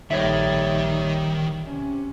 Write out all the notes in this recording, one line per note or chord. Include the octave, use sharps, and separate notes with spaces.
A#1 D#3 G3 C#5 E5
C3 C#4